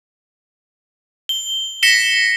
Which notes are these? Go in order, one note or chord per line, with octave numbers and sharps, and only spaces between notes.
G7
A#6 B6 C#7 E7 G7